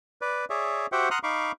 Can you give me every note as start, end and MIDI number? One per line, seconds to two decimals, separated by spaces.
0.22 0.45 71
0.22 0.45 74
0.50 0.87 68
0.50 0.87 73
0.50 0.87 74
0.50 0.87 76
0.92 1.09 66
0.92 1.09 67
0.92 1.09 72
0.92 1.09 76
0.92 1.09 78
0.92 1.09 79
1.11 1.19 78
1.11 1.19 82
1.11 1.19 84
1.11 1.19 87
1.11 1.19 89
1.11 1.19 90
1.23 1.52 63
1.23 1.52 77
1.23 1.52 83
1.23 1.52 85
1.23 1.52 86